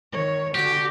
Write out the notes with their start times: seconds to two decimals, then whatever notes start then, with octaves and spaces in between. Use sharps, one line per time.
0.12 D#3 C#5
0.55 D3 F#4 G4